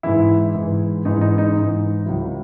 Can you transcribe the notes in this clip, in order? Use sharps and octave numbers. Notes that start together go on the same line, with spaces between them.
G#2 E3 E4
G#2 E3
G#2 E3 D#4
D#4
D#4
G#2 E3
C#2 C#3 F#3 E4